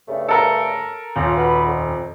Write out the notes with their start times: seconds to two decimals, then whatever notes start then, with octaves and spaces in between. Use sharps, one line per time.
0.08 G2 C#3 A3
0.29 A4 A#4
1.16 D#1 C#4 F4
1.37 F#4 B4
1.66 F2